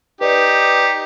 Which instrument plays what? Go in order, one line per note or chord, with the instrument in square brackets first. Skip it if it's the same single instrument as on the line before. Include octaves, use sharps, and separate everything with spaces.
[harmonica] D#4 G4 [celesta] B4 D5